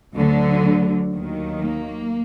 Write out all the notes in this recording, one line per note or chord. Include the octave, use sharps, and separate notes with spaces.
D2 D3 F#3
D#2 D#3 F#3
A#3